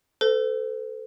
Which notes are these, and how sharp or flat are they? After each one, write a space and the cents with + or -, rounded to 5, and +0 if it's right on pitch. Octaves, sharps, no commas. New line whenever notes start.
A4 +0 C5 -45